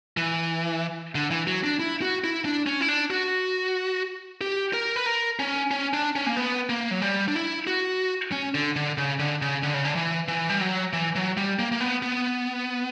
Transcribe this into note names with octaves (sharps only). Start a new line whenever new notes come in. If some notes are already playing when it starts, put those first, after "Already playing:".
E3
D3
E3
F#3
D4
E4
F#4
E4
D4
C#4
E4
D4
F#4
G4
A#4
B4
A#4
C#4
C#4
D4
C#4
A#3
B3
A#3
F#3
G3
D4
E4
F#4
C#4
D3
D3
C#3
D3
C#3
D3
C#3
D3
E3
E3
G3
F#3
E3
F#3
G3
A#3
A#3
B3
B3